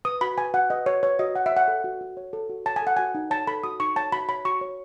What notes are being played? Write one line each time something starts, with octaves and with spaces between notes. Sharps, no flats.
B4 D#6
F#4 B5
B4 G#5
F#4 F#5
B4 D#5
F#4 C#5
B4 C#5
F#4 D#5
F#4 F#5
E5
C#5 F#5
A4
F#4
F#4
C#5
A4
F#4
C#5 A5
G#5
A4 F#5
F#4 G#5
D#4
C#5 A5
A4 B5
F#4 D#6
D#4 C#6
C#5 A5
F#4 B5
C#5 B5
F#4 C#6
C#5